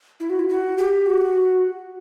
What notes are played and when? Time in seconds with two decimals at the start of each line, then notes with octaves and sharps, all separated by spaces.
0.20 E4
0.30 F#4
0.39 E4
0.49 F#4
0.78 G4
1.06 F#4